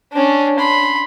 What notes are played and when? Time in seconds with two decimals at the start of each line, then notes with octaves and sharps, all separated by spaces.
0.13 C#4 D4
0.59 B5 C6